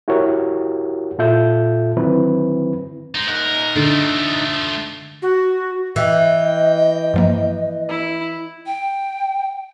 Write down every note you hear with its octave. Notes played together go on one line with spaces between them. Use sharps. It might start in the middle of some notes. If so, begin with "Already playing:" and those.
E4 F#4 G4 A#4 C#5
A#2 F4 A4 E5 G6
D3 D#3 F#3 C4 E4 B4
G#3 D#4
D#4 A#4 F#5
D3 A3 F4
F#4
E3 D#5 G5
G2 F3 A#3
E4
G5